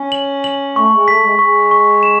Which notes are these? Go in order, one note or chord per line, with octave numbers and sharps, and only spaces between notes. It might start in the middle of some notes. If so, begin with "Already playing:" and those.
Already playing: C#4
F#7
F#7
A3 C#6
G#3
A3 B6
G#3
G#3 C#6
C#6
E7